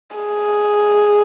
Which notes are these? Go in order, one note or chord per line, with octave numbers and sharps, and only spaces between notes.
G#4